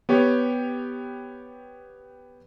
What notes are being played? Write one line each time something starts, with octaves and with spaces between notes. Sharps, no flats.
B3 G4 C#5